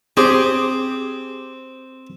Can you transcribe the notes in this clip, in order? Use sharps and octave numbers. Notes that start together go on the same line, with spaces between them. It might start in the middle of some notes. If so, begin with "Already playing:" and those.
C4 G4 G#4